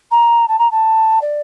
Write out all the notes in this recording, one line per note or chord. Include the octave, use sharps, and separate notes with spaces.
A#5
A5
A#5
A5
D5